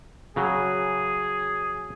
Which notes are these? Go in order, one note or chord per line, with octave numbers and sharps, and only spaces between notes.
C#3 F#3 G#4